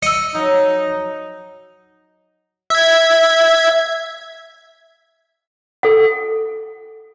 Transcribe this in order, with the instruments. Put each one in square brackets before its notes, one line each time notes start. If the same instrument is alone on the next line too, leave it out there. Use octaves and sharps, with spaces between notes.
[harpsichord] D#5 [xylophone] E6 C#7
[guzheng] F#3 [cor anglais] D#4
[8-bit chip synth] E5 G#6
[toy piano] A4 F#5